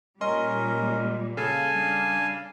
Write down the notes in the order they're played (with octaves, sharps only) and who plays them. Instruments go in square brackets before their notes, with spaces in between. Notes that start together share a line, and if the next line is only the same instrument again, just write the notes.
[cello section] A#2 G3 [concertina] C#4 A#4 [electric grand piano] D#5 C6
[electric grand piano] C#3 A4 [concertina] F5 G#5 A5
[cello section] G3 D4